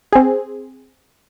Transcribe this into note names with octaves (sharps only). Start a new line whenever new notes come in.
C4 G#4